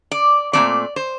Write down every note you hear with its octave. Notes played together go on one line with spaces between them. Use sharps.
D5
A#2 F#3 A3 C4 D5
C5